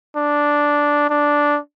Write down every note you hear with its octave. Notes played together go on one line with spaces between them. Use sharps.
D4
D4